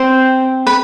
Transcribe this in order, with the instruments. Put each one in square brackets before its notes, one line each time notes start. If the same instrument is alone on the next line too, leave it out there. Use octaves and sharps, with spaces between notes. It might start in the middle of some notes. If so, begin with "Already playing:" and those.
Already playing: [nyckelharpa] C4 [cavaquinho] C5 C6
[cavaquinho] B4 B5